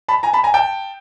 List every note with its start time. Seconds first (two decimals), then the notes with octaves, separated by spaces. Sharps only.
0.08 A5 B5
0.23 G#5 A#5
0.33 A5 B5
0.44 G#5 A#5
0.54 G5 A5